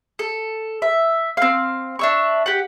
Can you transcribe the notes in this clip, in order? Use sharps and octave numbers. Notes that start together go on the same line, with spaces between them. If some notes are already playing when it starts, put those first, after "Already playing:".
A4
E5
C4 F5
D4 E5 C#6
G4 F#5